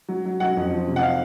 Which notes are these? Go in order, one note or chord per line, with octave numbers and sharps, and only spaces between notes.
F#3
F#3
F#3 F#5
F2
F3
C3
F#5
F5